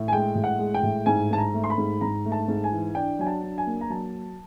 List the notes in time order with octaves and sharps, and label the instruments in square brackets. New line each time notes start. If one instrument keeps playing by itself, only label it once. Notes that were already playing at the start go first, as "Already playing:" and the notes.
Already playing: [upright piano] A2
G#5
G#3 G5
A2
F#5
G#3
G5
A2
G#2 G#5
G#2 A5
A#5
A3
C6
B5
G#2
G#2 A#5
A3
A5
G#2
G#5
E3
D4 G5
F#3 G#5
A5
D4
G#5
A#3
A#5
F#3 A5